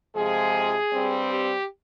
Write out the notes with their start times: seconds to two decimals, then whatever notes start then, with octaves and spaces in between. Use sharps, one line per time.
0.15 F2 C3 F3 G#3 G#4
0.92 G2 G3 C4
1.30 G4